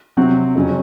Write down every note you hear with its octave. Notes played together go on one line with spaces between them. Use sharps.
C3 F#3 C4 F#4
F2 C#3 F#3 C#4